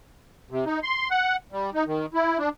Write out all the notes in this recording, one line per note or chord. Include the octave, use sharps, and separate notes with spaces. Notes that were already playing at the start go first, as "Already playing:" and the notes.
C3
D#4
C6
F#5
G3
D#4
D#3
E4
D4